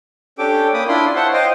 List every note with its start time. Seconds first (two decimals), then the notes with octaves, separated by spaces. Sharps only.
0.38 C#4 D4 G4 A4 G5 D6
0.74 A#3 C#4 B5 D6 D#6
0.88 D4 E4 F4 B5 C6
1.16 C5 C#5 E5 F#5 A5 C6
1.34 C5 D#5 F5 G5